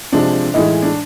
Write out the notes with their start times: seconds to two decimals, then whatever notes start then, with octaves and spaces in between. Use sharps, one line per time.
0.12 C3 F3 G#3 D4
0.54 A2 E3 G#3 D#4
0.82 D4